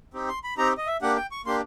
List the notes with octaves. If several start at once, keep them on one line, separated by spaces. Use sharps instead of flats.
C4 D#4 G4
C6
B5
C4 D#4 G4 A#5
D#5
E5
A#3 D4 G4 F#5
G5
C#6
A#3 D4 G4 C6